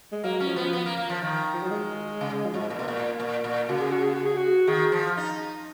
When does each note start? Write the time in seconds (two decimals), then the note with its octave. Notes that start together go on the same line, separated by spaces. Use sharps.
0.12 G#3
0.24 F#3 A#3
0.40 C#4
0.48 F3
0.56 B3
0.73 B3
0.86 A#3
0.97 A#3
1.09 F3
1.22 D#3
1.53 F3
1.63 F#3
1.71 G#3
2.21 C#3
2.45 F3
2.53 G#2 F#3
2.62 G#3
2.70 A#2 A#3
2.79 B2
2.88 A#2
3.20 A#2
3.44 A#2
3.69 C#3 F#4
3.81 G#4
3.92 F#4
4.03 G#4
4.14 F#4
4.26 G#4
4.37 F#4
4.67 D#3 G#4
4.92 F3
5.17 D#4